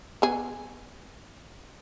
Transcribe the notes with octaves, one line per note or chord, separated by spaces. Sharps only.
B3 G#4